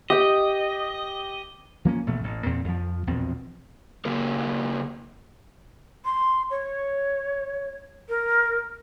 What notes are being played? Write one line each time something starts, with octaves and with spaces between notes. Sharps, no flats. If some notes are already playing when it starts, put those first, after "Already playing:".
G4 D#5 G5
F3 A#3 C#4
A1 B2 A3
A1 A2
E2 A#2 C4
F2 F3
A#1 E2 B2 C4
C#3 A#3 G4 A#4
C6
C#5
A#4